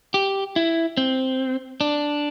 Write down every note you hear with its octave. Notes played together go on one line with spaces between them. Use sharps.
G4
E4
C4
D4